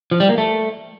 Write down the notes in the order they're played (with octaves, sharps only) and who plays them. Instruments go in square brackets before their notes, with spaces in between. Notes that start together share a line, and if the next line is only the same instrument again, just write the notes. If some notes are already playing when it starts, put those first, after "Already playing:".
[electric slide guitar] F3
G3
A#3
A3